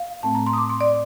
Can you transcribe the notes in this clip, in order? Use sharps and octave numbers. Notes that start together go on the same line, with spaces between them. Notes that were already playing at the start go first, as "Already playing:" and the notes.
Already playing: F5
A2 A3 C4 A5
A#5
C6
D#6
D6
C6
D5